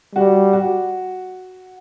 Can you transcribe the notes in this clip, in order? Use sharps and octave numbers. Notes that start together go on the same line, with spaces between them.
G3 F#4
F#4